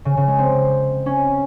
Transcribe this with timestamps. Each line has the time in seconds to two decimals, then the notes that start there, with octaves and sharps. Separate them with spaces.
0.05 C#3
0.17 C#3
0.28 G#3
0.39 C4
1.06 C#4